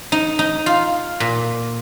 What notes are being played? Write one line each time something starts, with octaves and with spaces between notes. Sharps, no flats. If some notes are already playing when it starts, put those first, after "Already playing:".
D#4
D#4
F4
A#2